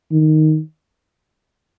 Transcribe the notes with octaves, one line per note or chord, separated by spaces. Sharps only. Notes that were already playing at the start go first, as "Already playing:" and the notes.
D#3